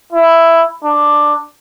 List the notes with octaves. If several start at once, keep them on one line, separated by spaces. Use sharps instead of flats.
E4
D4